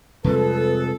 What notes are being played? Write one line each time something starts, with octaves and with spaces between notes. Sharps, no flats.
F2 C3 G3 G#3 G#4 A4 B4